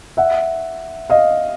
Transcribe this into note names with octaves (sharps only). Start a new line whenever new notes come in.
E5 F#5
D#5 F5